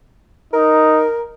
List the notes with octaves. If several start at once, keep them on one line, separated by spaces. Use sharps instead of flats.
D#4 A#4